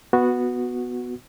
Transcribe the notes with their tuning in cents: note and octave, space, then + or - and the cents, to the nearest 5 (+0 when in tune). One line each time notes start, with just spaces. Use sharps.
B3 +0 F#4 -10